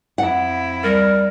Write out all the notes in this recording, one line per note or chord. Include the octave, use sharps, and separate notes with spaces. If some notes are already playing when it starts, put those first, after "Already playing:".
F2 E4 F#5
G3 A#4